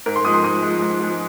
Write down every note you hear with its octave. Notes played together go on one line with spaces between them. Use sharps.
G#2 A#4
C6
F3 G#3 D#6
C6
G#2 D#6
G#3
F3
G#2
F3 G#3